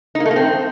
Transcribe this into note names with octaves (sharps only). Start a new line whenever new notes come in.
D#4
A#3
A3
A#3
C4